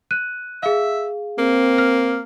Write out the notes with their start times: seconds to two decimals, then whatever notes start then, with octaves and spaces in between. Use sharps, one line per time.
0.11 F#6 D#7
0.63 G#4 E5 F5
1.39 A#3 C4
1.78 F6